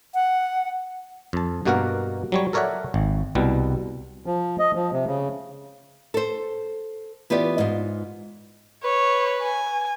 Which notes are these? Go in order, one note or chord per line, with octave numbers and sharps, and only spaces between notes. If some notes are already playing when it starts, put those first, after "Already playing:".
F#5
F2 A5
G2 B2 A#3 F#4 A#4 F#5
F#3 G3 C#5
A4 A#4 C#5 D5 E5 F#5
G#1
C2 B2 G3
F3
D#5
F3
C3
C#3
A4 C5
E3 B3 F4 G4 D5
G#2 F4
B4 C#5
G#5